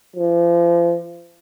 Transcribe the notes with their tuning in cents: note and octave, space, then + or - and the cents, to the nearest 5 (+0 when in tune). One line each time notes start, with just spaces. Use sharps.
F3 -35